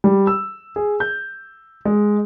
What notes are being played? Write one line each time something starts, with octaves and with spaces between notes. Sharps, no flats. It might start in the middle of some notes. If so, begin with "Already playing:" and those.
G3
E6
G#4
G6
G#3